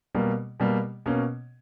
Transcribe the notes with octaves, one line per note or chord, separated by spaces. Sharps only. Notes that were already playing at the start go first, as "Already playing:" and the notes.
B2 G3 A#3
B2 G3 A#3
B2 A#3 C#4